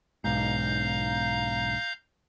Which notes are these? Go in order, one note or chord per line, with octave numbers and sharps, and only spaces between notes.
B1 G#2 F5 A#5 G6